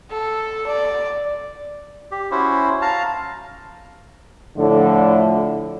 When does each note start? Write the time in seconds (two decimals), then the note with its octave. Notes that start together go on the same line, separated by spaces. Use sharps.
0.10 A4
0.67 D5
2.11 G4
2.31 C#4 E4 F#4 C5
2.82 F5 A5 A#5
4.57 A2 D3 F3